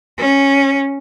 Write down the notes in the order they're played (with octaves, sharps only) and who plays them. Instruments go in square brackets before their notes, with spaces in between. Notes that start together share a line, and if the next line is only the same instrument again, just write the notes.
[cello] C#4